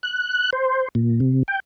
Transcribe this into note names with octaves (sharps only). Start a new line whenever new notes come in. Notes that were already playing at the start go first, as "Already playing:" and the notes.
F#6
C5
A#2
C3
G5